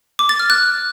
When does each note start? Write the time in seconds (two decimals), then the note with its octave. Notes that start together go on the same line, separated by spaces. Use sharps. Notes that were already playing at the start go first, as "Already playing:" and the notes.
0.19 D6
0.29 A6
0.40 F6
0.50 F#6